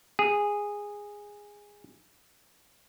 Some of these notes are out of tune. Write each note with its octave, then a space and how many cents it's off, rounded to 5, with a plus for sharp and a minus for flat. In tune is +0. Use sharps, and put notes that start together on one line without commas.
G#4 -10